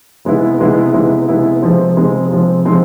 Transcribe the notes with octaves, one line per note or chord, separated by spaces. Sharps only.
C3 G#3 B3 E4
C3 G#3 B3 E4
C3 G#3 B3 E4
C3 G#3 B3 E4
C3 F3 G#3 C4
C3 F3 G#3 C4
C3 F3 G#3 C4
C3 F3 G#3 C4